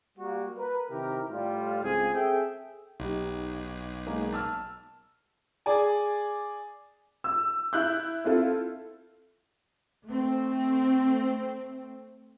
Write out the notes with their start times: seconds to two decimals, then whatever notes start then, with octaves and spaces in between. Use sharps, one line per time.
0.18 G3 A#3 F#4
0.57 A#4 B4
0.90 C3 D#3 E4 G4 A#4
1.29 A2 G3 F4
1.83 C#2 C#3 C4 G#4
2.13 C4 G#4 A4 E5 G5
3.00 B1 D#4 G4
4.06 G#3 A#3 D#4
4.32 A5 E6 F6
5.66 G#4 D5 G#5
7.24 E6
7.73 E4 F#6 G6
8.25 C4 E4 F4 A4
10.05 A3 C4